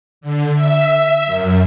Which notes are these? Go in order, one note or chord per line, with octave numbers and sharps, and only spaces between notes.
D3
E5
E5
F#2